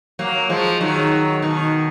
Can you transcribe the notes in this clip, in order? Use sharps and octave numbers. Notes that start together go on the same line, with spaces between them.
F#3 A#3
F3 G#3
D#3 F#3
B2 D#3